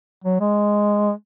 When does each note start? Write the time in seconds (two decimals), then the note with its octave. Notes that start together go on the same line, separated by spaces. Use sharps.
0.24 F#3
0.40 G#3